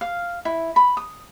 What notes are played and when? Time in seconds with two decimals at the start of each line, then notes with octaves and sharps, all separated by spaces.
0.01 F5
0.45 E4
0.76 B5
0.97 D#6